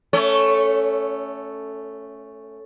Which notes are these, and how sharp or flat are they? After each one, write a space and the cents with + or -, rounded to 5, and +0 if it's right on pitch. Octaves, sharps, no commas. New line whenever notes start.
A3 +0 C#4 +0 C#5 +35